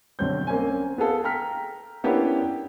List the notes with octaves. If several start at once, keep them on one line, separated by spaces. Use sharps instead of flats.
B1 D3 G3 C4 C#5 G6
A#3 C4 C#4 C5 G#5
B3 G#4 A4 F5
G5 A#5 F6 B6
A#3 B3 C#4 D4 E4 G4
G5